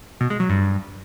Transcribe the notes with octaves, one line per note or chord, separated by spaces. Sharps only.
B2
G#3
F#3
G2